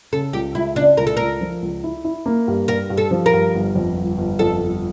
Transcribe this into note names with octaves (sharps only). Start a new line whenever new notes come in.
C#3 A4
C#2 G4
C#2 E4
C#3 D4
C#2 A#4
A4
C#2 A#4
F3
C#2
E4
E4
A#3
G2
G2 A#4
G2
A4
F3
A#4
G2
G1
F2
G1
G1
F2 A4
G1